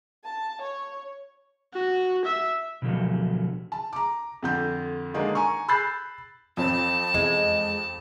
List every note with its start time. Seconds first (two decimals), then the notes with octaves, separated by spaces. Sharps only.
0.24 A5
0.61 C#5
1.74 F#4
2.25 E5
2.82 B2 D3 F3 F#3 A3
3.72 A5
3.93 A#5 D6
4.42 F2 D3 G6
5.14 D3 D#3 G#3 A#3 D4
5.35 G#5 A#5 C#6
5.68 B5 E6 F#6 G6 A6 C7
6.57 F2 C4 A5
7.14 E2 G#3